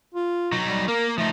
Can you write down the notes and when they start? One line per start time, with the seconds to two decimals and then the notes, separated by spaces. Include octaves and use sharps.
0.14 F4
0.52 F#3 D#4
0.67 G3
0.88 A#3 A#4
1.18 F3 A3 D#4